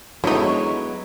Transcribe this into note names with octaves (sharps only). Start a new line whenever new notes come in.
D3 F#3 G#3 B3 D#4 E4 C#5